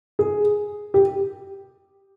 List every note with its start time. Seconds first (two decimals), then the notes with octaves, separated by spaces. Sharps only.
0.19 G#4
0.94 G4